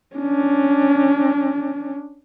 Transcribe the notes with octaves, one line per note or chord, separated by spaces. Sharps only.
C#4 D4